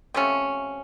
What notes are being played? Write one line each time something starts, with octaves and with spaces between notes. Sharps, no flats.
C3 F3 A3 C#4